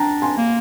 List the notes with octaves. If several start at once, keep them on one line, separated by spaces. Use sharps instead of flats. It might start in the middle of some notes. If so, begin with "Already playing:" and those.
Already playing: D4 G5 A#5
G#5 C6
A#3